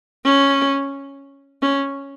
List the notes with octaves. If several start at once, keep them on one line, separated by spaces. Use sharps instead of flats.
C#4
C#4